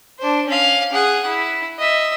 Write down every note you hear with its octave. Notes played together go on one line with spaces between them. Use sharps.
D4 C5
C#4 F5
G#4 F#5
E4
D#5 E5